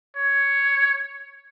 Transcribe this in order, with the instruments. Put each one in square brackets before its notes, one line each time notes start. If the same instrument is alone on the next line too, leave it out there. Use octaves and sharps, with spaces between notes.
[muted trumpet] C#5